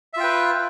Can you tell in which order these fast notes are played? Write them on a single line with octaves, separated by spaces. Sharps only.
E5 F4 G5 B4